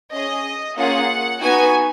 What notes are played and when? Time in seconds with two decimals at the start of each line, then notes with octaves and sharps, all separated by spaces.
0.12 C#4 G#4 D#5
0.76 A#3 C#4 F4 G#4 F#5
1.41 B3 D#4 F#4 G#5